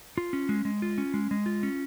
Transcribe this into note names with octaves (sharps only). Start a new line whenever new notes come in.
F4
C#4
G#3
G#3
F4
C#4
G#3
G#3
F4
C#4